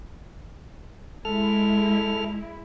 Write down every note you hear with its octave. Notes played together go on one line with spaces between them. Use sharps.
G#3 E4 A4 F6